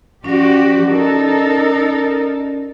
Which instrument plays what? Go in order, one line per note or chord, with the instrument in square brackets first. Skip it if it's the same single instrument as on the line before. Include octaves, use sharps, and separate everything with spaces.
[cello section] F3 F#4 G4 [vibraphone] C#4 D5
[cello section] D#4 A4 A#4